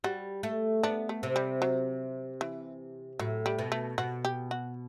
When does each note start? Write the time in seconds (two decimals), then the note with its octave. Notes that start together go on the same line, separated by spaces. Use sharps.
0.04 G3 F#4
0.43 A3
0.83 B3 D4
1.09 A3
1.23 C3
1.36 G3
1.62 F#3
2.41 E3
3.19 A2 F#3
3.46 G3
3.59 B2
3.72 A3
3.98 B2 F#4
4.25 G4
4.51 F#4